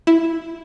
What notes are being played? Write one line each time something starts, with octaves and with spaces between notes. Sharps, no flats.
E4